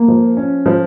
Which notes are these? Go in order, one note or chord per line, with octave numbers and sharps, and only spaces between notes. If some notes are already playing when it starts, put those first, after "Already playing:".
Already playing: A#3
F3
C#4
F3